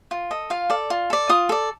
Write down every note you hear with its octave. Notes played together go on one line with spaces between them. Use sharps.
F4
A4 D#5
F4 F5
A4 D5
F4
A4 D5
F4 D#6
A4 D5